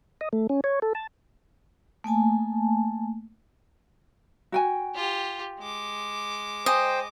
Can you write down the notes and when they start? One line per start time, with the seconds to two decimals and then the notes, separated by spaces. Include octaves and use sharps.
0.21 D#5
0.33 A3
0.49 C#4
0.64 C#5
0.82 A4
0.95 A5
2.04 A3 A#3 G#5 A5
4.52 F#4 G5 G#5
4.95 F4 G4
5.59 G#3 D6
6.66 C5 D#5 G5 G#5